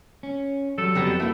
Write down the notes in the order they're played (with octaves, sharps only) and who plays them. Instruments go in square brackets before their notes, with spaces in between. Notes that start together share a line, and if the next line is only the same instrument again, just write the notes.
[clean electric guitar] C#4
[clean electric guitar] F#3 G3 [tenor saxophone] A4
[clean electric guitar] F2 [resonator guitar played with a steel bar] F#3 G3 B3
[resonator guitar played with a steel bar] A3 E4 [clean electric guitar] A#3